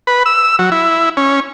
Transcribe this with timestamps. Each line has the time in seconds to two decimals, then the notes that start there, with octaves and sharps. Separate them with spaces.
0.07 B4
0.26 E6
0.59 F#3
0.72 E4
1.17 C#4